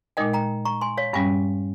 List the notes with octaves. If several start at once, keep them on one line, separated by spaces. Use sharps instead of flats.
A#2 G#3 D#4 A#4 D#5 G5
G5 A#5
A#5 C#6
G#5 C6
C#5 F5
G2 G3 C#4 F5 G#5